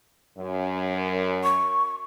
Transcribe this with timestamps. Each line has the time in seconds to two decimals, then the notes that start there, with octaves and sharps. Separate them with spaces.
0.38 F#2
1.44 C#6